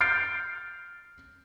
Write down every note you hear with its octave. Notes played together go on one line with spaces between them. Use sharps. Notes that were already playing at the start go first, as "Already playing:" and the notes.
F6 G6 A6 C7 D7